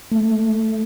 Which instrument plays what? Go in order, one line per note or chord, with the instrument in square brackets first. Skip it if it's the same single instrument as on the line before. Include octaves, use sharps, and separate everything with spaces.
[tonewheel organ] A3